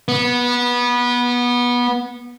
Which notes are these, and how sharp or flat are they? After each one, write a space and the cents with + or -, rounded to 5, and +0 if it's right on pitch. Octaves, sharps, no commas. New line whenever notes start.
B3 -20